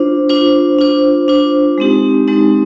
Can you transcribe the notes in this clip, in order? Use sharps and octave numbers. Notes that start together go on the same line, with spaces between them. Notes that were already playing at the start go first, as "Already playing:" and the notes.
Already playing: D4 F4 C5
D4 F4 C5
D4 F4 C5
D4 F4 C5
G#3 C4 D#4 G4
G#3 C4 D#4 G4